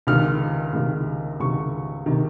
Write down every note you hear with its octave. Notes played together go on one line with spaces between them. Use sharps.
C#2 C3 D#3 F6
C#2 C3 D#3
C#2 C3 D#3 C#6
C3 D#3